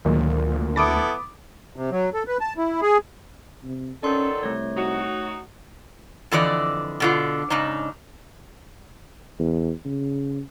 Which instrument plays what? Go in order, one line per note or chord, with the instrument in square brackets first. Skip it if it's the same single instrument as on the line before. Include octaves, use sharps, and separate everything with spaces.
[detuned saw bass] D2 [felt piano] A#2 [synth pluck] D#3 F#3 G#3
[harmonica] B3 E4 A4 [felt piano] B5 D6 D#6 [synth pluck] A6 D7
[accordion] C3
F#3
A4
B4
A5
E4
G#4
[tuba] C3
[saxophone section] D#3 F#3 A4 [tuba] C#4 [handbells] D5 C6
[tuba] C2 [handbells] A3 C#5
[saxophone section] D#4 F#4
[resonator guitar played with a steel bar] F2 D3 E3 D5 D#5
B2 D3 F4
G#2 C#3 D4 D#4
[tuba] E2
C#3